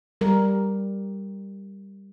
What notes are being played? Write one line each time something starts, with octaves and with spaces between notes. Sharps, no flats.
G3 A#4